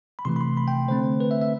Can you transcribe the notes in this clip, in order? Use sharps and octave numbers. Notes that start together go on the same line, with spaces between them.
B5
C3 E3 A3 C6
B5
C6
B5
G5
D3 A3 C4 C5
B4
E5
E5